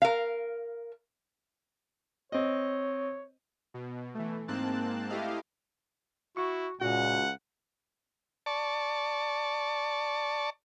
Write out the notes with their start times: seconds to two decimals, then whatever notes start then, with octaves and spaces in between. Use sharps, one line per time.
0.02 A#4 F5
2.32 C4 C#5 D#5
3.74 B2
4.15 E3 A3
4.48 G#2 A#3 C4 A5 F#6
5.09 A3 E4 G4 D#5 F5
6.37 E4 F#4 C#6
6.81 C#2 A#2 F#4 F#5
8.46 D5 A5 C#6